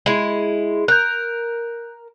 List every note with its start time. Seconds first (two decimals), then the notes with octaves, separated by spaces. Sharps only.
0.06 G#3 E4
0.88 A#4 F#6 G6